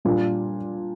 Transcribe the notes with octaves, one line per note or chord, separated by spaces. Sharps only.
A#2 G3 D4 F4